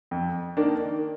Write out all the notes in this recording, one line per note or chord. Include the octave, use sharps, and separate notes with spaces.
F2
D#3 A#3 D4